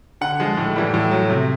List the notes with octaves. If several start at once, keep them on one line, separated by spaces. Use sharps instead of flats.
D3 F#5
F3 G#3
A2
E3 G3
A2
F#3
C3